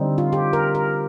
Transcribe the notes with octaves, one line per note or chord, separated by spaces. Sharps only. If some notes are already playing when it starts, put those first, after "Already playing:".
Already playing: D3 G3 C4 D#4
F4
G4
A#4
A#4